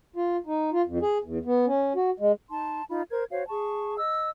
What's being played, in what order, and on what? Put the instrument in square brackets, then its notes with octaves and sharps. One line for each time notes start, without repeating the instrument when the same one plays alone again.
[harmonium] F4
D#4
F4
F2
G#4
E2
B3
C#4
F#4
G#3
[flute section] D#4 A5 C6
D#4 F4 B5
A#4 C5 G#6
F#4 C5 C#5 F5
G#4 A5 C#6
D#5 E6